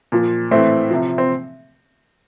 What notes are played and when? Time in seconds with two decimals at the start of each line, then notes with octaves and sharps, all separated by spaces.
0.12 A#2 F3
0.51 A2 E3 A3 C4
0.90 C3 F3
1.18 C4